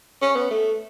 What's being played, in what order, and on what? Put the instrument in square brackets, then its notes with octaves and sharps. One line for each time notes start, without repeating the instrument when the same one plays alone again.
[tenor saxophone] C#4
B3
A3